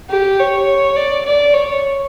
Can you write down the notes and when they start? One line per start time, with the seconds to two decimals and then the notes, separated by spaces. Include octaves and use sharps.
0.10 G4
0.39 C#5
0.96 D5
1.25 D5
1.54 C#5